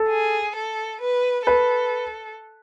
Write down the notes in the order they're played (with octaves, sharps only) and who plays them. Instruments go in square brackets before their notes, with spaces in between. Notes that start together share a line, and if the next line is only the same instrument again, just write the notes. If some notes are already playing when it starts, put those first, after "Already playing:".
Already playing: [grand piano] A4
[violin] G#4
A4
B4
[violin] A4 [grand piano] B4